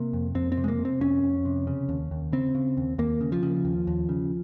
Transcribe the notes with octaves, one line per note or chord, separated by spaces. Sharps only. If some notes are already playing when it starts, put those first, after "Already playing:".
Already playing: C3 A#3
F2
F2 C4
C4
C3
G#3
A#3
C3
C4
F2 C#4
F2
C3
C#3
D#2
D#2
C#3 C4
C#3
D#2
D#2 A#3
C#3
F3
C#3
D#2
D#2
C#3